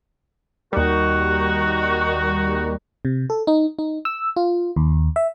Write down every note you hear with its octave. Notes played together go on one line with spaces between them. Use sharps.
D#2 D#3 G3 D#4 F#4
C3
A4
D#4
D#4
E6
F4
D#2
E5